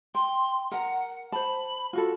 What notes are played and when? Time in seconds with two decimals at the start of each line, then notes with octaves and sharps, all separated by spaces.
0.15 G5 C6
0.72 A#4 F#5 A#5
1.32 C5 A5 B5
1.93 F4 F#4 A4